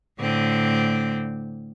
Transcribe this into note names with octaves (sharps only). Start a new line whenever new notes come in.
A2 D3 C4